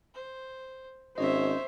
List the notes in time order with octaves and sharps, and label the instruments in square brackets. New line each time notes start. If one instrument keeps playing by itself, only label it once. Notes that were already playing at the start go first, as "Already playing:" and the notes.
[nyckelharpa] C5
[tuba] G#1 [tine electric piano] C#4 D#5 [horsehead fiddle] C5 [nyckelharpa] C#5 E5